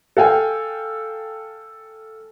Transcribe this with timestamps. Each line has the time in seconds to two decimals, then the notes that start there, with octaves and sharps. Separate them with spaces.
0.17 A4 F5 G5 G#5